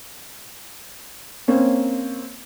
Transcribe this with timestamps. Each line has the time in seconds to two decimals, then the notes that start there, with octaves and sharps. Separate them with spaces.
1.48 A#3 C4 C#4